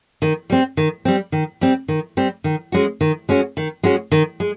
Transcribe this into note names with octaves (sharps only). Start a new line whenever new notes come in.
D#3
G3 C4
D#3
G3 C4
D#3
G3 C4
D#3
G3 C4
D#3
G#3 C#4 F#4
D#3
G#3 C#4 F#4
D#3
G#3 C#4 F#4
D#3
G#3